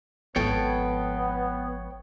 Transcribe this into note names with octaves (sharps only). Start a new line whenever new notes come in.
G#1 F3 B3 A4 C#5 G5